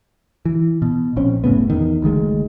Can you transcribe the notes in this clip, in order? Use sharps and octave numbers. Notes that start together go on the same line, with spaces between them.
E3
B2
A#1 C4 C#4
F#1 A2 C#3 B3
E2 D#3
F#1 D2 D#3 G#3